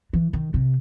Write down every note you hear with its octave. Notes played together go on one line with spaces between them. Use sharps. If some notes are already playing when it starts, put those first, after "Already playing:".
E3
D#3
C3